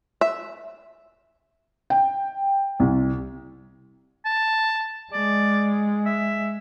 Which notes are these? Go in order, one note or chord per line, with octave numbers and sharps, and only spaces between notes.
E5
G5
C2
A5
G#3 D5
E5